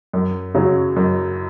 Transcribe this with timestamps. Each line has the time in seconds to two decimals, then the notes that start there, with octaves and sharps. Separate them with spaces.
0.13 F#2
0.55 C#3 F#3 C#4
0.96 F#2